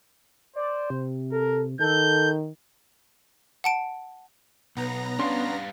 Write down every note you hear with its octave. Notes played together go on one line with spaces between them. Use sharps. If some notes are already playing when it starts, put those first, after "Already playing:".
C5 D5
C3
A4 A#4
D#3 A4 G6
F#5 A5 D7
B1 B3 A#5 A#6
G3 C#4 D4 F5 C6